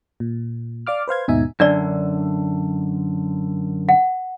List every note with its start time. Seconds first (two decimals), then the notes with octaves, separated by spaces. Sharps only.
0.20 A#2
0.87 D5 F5 D6 F6
1.08 B4 C5 F5 G#6
1.28 D#2 G#2 B2 D#4 E5 G#5
1.60 F#2 D3 D4 D5
3.89 F#5